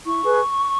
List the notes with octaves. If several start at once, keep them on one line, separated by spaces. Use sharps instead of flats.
E4 C#6
G#4 B4